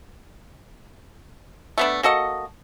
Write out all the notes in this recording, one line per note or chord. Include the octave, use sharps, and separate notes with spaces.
A3 B3 D4
A#3 F#4 A4 D#5